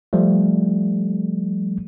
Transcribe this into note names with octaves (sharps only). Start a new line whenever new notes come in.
F3 G3 A3